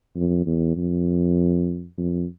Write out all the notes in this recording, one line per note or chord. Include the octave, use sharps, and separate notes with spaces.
F2
E2
F2
F2